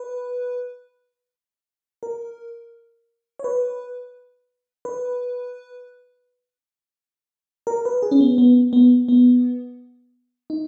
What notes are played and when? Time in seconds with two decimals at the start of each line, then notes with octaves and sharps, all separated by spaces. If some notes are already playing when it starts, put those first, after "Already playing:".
Already playing: B4
2.03 A#4
3.39 C#5
3.44 B4
4.85 B4
7.67 A#4
7.85 B4
8.02 G#4
8.11 C#4
8.20 B3
8.38 B3
8.73 B3
9.08 B3
10.50 D#4